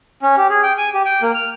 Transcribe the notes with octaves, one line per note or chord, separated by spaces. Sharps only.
C#4
G4
G#4
G5
G#5
G4
G5
A#3
F6